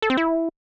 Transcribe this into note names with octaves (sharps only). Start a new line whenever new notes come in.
A4
C4
E4